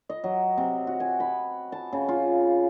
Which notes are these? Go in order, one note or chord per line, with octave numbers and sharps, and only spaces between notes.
D#5
F#3
C3
F#4
G#5
B5
A5
C#3
F4